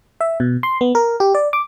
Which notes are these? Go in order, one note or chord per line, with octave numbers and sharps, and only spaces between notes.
E5
B2
C6
B3
A#4
G4
D5
D6